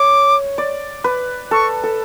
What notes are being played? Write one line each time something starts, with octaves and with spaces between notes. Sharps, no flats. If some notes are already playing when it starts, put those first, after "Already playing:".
Already playing: C#5 D6
D5
B4
A4 C#6
A4